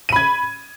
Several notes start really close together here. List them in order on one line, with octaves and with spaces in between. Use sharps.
D#7 B5 G#6